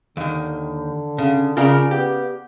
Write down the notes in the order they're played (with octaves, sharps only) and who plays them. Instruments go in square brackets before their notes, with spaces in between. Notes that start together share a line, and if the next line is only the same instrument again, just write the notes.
[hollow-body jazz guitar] D#2 D#3 [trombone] D3
[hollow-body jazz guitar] C#3
[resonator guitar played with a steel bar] C#3 D5 F5 [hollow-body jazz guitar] F4 A#4 [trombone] G#4
[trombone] B3 [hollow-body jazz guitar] G4